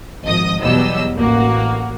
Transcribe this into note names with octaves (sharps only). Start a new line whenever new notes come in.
G#1 F3 D#5 D#6
E2 B2 F#3 G3 D#5 E6
A1 A#3 F#4